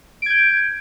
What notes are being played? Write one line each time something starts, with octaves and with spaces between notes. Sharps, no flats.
G6 G#6 D7